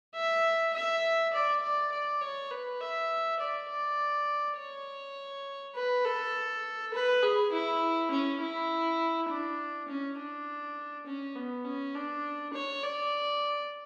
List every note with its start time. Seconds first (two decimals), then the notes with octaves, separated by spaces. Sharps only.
0.15 E5
0.74 E5
1.33 D5
1.63 D5
1.92 D5
2.21 C#5
2.51 B4
2.81 E5
3.40 D5
3.69 D5
4.57 C#5
5.76 B4
6.05 A4
6.94 B4
7.23 G#4
7.52 E4
8.11 C#4
8.41 E4
9.29 D4
9.88 C#4
10.18 D4
11.06 C#4
11.36 B3
11.65 C#4
11.95 D4
12.53 C#5
12.83 D5